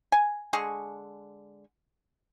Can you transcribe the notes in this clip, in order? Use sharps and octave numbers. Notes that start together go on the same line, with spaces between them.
G#5
D3 G#3 G#4 C#6